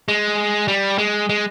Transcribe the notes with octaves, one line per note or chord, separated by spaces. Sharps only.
G#3
G3
G#3
G#3